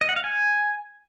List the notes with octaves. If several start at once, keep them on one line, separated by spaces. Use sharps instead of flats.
D#5
F#5
F5
G#5